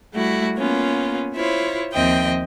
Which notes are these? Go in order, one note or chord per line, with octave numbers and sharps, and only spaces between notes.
G3 A3 E4 F#4
A#3 B3 C#4 F4
E4 F4 C5 C#5
D#2 F3 C4 D#5 E5 G5